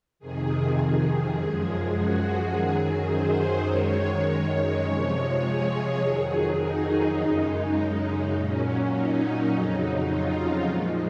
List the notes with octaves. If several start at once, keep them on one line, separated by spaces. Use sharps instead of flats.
F2 C3 D#3 G#4
G#4
F#2 F3 G#3 G#4
F#4
F#2 D#3 F#3 G#4
C5
F#2 D#3 G#3 C#5
C3 F3 G#3
G#4
F2 D#3 F#3 G#4
D#4
F#2 C#3 G#3
A#2 F#3 C#4
D#4
F2 C#3 F#3 D#4
F4
A#2 F3 G#3